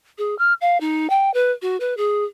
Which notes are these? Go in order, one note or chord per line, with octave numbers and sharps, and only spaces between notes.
G#4
F6
F5
D#4
G5
B4
F#4
B4
G#4